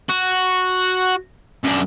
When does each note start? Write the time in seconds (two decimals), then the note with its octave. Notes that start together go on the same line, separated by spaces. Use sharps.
0.09 F#4
1.64 F#2 D4